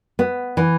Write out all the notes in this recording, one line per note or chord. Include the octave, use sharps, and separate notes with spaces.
B3
E3